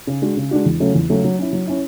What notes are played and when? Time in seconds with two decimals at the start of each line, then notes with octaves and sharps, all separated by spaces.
0.07 C#3
0.22 G#3 D4 F#4
0.37 C#3
0.51 G#3 D4 F#4
0.66 E2
0.80 C#3 F#3 A3 C#4
0.95 E2
1.09 C#3 F#3 A3 C#4
1.24 F#3
1.39 C#4 E4
1.53 F#3
1.67 C#4 E4